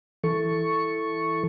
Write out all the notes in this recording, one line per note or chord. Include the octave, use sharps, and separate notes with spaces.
E3 A4 C#6